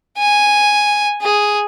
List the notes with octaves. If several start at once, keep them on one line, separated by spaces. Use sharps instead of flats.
G#5
G#4